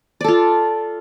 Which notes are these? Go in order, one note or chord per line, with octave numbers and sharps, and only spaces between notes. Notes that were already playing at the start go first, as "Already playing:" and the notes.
F4 A4 D5